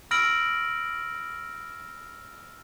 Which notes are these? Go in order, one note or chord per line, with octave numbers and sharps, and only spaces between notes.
B5 E6 F6 A#6 D7 F#7